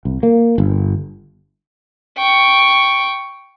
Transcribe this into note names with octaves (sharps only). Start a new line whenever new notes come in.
C2
A#3
G1
G5 C#6